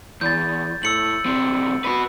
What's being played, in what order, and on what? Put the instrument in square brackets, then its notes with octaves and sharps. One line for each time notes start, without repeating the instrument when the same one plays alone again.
[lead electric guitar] E2 [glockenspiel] G6 A6
[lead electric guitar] A2 [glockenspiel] E6 C#7 F#7
[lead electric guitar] B1 C4
F#4 B4